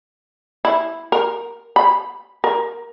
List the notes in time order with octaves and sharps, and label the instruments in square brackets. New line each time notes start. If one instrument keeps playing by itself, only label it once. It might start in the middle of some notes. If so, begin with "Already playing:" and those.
[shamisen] E4
A#4
B5
A#4